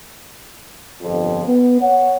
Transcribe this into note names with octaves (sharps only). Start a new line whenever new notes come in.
G1 F2
B3
C#5 F#5